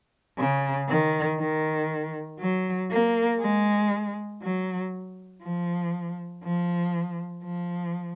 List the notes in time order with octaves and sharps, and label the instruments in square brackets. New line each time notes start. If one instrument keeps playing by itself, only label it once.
[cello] C#3
D#3
D#3
F#3
A#3
G#3
F#3
F3
F3
F3